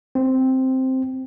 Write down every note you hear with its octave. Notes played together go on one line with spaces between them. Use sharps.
C4